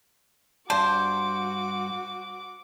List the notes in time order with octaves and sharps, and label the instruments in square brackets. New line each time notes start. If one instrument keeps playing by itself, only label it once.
[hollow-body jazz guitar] G2 D5 A5 [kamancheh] F#4 D6 [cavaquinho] C5